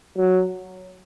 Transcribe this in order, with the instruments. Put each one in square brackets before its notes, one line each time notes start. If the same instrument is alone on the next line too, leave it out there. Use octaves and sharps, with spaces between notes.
[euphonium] F#3